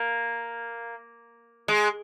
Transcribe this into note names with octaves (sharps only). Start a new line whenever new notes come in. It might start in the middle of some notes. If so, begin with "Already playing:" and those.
Already playing: A#3
G#3